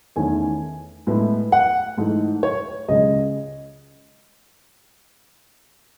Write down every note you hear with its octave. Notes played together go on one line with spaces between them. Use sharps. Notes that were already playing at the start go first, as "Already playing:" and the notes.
E2 D#3 A3 C#4 E4 G#5
A2 G#3 B3 E4
F#5
G#2 E3 A3 D#4
C#5
C#2 C#3 G#3 D#5